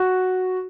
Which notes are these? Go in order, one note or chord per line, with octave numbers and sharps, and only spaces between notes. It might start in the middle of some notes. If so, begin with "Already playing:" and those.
Already playing: F#4